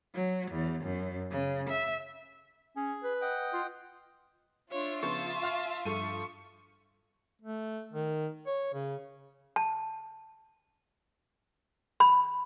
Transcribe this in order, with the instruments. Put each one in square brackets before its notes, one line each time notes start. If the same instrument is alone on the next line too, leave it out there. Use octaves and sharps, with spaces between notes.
[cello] F#3
E2
F#2
C#3
E5
[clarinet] C#4 [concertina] G#4
[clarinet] B4
[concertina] D#5 F#5 G5
[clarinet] F4
[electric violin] D4 C#5 [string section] F4 E5
[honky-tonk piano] C#3 F3 B3 [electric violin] A5 [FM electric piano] C#6
[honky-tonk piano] F5 F6
[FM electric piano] G2 [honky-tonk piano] F3 A4 D#7 [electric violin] C#6
[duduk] A3
D#3
C#5
C#3
[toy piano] A5
B5